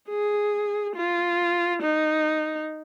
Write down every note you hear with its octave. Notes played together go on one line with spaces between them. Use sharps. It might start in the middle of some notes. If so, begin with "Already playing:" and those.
G#4
F4
D#4